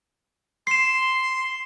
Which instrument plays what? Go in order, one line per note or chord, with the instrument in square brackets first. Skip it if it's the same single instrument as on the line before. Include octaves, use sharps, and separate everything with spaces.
[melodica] C6 [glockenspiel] C7 E7